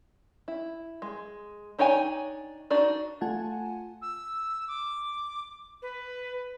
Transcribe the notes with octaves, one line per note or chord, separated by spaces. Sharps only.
E4
G#3
D4 D#4 C#5 G5 G#5
D4 D#4 F#4 D5
A3 F4 F#5 G#5 A5
E6
D6
B4